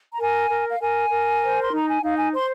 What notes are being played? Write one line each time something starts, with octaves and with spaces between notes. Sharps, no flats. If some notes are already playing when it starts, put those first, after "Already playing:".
A#5
A#4 G#5
A#4
F5
A#4 G#5
A#4
C5
C6
D#4 A#5
G#5
D#4 F5
G#5
C5 C6